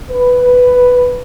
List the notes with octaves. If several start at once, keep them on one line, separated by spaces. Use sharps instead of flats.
B4